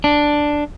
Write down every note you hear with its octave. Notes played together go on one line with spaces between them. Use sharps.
D4